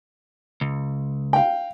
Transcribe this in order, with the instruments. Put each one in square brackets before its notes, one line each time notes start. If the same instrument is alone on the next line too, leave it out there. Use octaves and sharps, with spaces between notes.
[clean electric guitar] C#2
[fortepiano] F5 G5